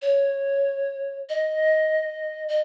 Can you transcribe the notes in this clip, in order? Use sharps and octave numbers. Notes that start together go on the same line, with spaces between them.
C#5
D#5
D#5